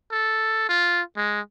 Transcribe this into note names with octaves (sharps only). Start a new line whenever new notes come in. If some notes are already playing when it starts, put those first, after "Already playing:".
A4
F4
G#3